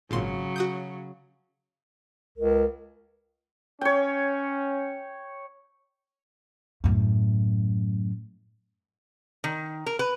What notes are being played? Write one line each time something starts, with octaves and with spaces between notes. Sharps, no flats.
G#1 A#2 C#3 F#3 C6
F#4 D#6 G6
C#2 A#4
C#4 C#5 G5
F#2 A2
D#3
A#4
B4